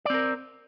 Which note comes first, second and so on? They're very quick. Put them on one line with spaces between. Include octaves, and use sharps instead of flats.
D5 C4 A#4